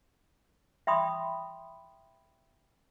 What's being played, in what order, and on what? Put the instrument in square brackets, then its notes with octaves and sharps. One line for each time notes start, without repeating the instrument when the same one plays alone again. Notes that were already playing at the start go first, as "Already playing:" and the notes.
[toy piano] E5 G5 B5 C6 D#6